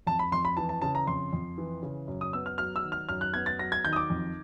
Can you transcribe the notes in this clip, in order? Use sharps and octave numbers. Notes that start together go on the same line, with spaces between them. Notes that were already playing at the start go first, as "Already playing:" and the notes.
F2 A5
B5
F2 C6
B5
E3 A5
A5
C#3 A5
A#5
F2 C6
F2
E3
C#3
F#2
D#6
B3 E6
F6
F#3 F6
E6
D#3
F6
F#2 F6
F#6
B3 G#6
A6
F#3 A#6
G#6
D#3 G6
D#6
D6
F2